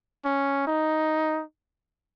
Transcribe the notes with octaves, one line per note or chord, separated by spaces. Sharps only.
C#4
D#4